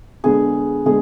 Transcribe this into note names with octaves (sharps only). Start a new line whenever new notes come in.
D3 G#3 B3 G#4
D3 G#3 B3 G#4